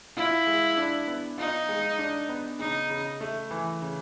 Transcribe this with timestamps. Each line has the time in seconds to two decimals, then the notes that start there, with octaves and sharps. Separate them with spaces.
0.16 E4 F4
0.47 G#3
0.77 D4
1.08 B3
1.38 D#4 F4
1.69 G#3
1.99 D4
2.29 B3
2.59 C#3 D#4
2.90 C#3
3.21 A3
3.51 E3
3.82 C#3